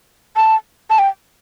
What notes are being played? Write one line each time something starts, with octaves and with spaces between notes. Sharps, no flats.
A5
A5
G5